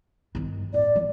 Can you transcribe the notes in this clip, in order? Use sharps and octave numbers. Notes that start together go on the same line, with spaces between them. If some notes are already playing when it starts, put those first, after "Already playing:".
G2 D#3
A2 D5
E3